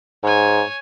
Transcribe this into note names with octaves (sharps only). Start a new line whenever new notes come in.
G#2 C#5 G#5